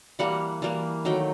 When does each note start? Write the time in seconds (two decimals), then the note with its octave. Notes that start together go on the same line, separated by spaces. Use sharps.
0.19 E3 G3 A#3 F#5
0.62 E3 G3 A#3
1.05 D#3 F#3 A3 G5